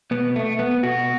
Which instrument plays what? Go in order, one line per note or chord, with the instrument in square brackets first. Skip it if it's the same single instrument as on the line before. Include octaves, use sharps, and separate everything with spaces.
[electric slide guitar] B2 B3
A3
B3
B2 F#4